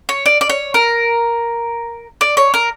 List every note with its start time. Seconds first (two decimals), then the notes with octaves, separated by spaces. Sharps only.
0.09 C#5
0.26 D5
0.41 D5
0.49 C#5
0.74 A#4
2.21 D5
2.37 C#5
2.54 A#4